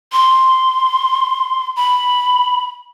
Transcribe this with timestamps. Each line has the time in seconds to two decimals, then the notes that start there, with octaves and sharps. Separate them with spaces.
0.12 C6
1.76 B5